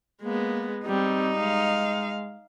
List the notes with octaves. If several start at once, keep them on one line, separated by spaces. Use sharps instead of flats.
G#3 A#3 B3
G3 C4 D#4
G#3 F5